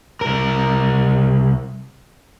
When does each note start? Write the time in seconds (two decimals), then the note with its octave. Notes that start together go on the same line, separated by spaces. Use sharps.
0.21 C2 A#4